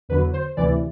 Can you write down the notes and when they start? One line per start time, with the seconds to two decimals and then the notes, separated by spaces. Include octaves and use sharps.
0.09 E2 D3 F#3 B4
0.34 C5
0.57 D2 C3 E3 D5